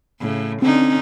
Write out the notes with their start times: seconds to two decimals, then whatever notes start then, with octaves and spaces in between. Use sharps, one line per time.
0.20 A2 C#3
0.62 D3 C4 C#4 D#4